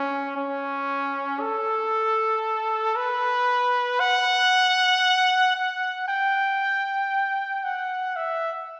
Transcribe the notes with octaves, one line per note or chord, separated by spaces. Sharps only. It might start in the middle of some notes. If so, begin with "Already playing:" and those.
Already playing: C#4
C#4
A4
B4
F#5
F#5
G5
F#5
E5